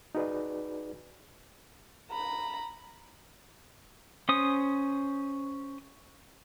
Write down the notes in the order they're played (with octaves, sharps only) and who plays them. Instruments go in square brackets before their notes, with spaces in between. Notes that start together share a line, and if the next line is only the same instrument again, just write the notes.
[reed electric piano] D#4 F#4 G#4 B4 D5
[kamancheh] A#5 B5
[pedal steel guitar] C#4 C5 D#6